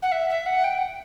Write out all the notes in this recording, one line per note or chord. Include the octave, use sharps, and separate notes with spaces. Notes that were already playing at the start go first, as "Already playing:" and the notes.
F#5
E5
E5
F#5
G5